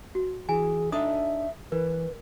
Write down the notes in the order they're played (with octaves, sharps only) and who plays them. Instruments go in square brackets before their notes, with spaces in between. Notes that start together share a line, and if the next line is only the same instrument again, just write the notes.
[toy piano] F#4
[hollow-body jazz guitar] E3 [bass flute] G#4 [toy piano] G#5
[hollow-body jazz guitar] D4 D#4 A4 [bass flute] E5 [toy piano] D#6
[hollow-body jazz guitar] E3 [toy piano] A#4 [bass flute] B4